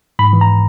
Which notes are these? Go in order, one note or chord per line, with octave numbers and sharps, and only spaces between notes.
G#2 B5
E3
A#5